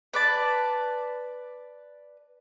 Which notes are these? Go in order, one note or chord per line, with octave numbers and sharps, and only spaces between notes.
B4 D5 A5